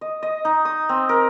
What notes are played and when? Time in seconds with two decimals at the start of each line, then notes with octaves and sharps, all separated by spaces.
0.01 D#5
0.23 D#5
0.45 D#4
0.65 D#6
0.89 C4
1.09 A#4